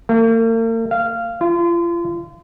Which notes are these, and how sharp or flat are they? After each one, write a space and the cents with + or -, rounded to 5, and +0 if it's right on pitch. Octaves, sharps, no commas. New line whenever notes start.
A#3 -45
F5 -15
F4 -35